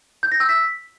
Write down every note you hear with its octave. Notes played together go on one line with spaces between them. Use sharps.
G6
A#6
E6
B6